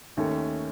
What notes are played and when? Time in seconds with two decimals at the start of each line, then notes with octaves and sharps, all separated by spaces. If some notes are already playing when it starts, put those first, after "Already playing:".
0.17 D#2 D#3 A3 C#4